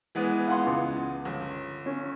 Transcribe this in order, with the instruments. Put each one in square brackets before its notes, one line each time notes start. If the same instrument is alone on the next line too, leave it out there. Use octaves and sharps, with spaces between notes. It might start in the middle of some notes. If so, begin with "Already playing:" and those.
[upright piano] E3 G#3 B3
[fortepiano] F5 F#5 C6
C#2
[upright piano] G1
[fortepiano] C#4